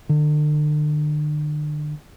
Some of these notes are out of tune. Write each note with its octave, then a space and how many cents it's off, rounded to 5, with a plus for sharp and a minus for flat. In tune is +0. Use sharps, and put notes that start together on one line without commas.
D3 +40